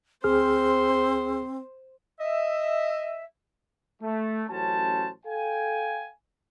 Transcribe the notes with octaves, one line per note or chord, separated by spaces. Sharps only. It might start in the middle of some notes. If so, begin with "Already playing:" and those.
D2 C4 G#4 C5 F6
D#5 E5
A3
A1 F#3 C#4 C5 A5
A4 F5 G5 G#5